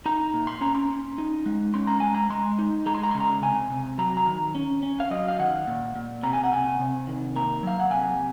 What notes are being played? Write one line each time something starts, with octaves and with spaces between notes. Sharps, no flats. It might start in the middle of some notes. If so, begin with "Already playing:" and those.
D#4 A#5
A#2
C6
C#4 A#5
C6
C#4
D#4
G#3
C#4 C6
A#5
G#3 G#5
A#5
G#3 C6
D#4
G#3 A#5
C6
A#5
C#3 C6
A#5
C3 G#5
C3
F#3 A#5
A#5
D#3
C#4
C#4
F5
F#3 D#5
F5
D#3 F#5
A#2
A#2
C3 A#5
G#5
F#5
C3 G#5
C3
D#3
A#3 A#5
F#3 F5
F#5
C3 G#5